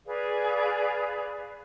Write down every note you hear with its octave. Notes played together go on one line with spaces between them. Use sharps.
G#4 B4 D5 F5